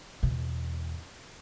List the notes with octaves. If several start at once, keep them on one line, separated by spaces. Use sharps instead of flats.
E2 B2